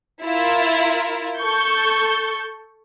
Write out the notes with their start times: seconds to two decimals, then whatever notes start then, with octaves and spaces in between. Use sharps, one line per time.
0.23 E4 F4 A#4
1.38 A4 C#6 G6